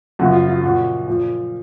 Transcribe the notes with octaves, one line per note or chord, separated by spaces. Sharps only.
F#2 C#3 F3 F#4
F4
F4
A#2 F3 F#4
A#2 F3